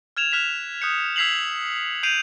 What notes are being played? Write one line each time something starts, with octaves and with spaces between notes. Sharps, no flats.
F6 G#6 E7 F7
F6 F#6 B6 E7 F7
D#6 F#6 G6 C#7
E6 G#6 B6 C7 F7 F#7
G6 C7 D7 D#7 F7